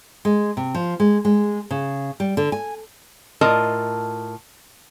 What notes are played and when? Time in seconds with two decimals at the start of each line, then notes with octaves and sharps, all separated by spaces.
0.25 G#3
0.57 C3
0.75 F3
1.00 G#3
1.25 G#3
1.71 C#3
2.20 G3
2.37 D3
2.52 G#5
3.41 A2 F4 A#4 D#5 A5